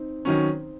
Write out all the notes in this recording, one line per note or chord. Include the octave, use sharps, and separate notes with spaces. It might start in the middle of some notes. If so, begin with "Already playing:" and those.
Already playing: C4 D#4
D#3 F#3 C#4